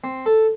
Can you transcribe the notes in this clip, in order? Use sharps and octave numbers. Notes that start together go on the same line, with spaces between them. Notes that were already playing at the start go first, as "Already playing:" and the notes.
C4
A4